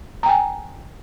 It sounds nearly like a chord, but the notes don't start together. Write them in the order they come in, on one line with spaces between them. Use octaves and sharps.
A#5 G5 G#5